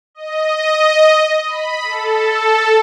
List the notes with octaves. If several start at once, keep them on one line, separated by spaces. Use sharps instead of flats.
D#5
B5
A4